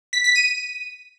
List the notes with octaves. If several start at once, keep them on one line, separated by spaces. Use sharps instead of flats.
B6
B6
D#7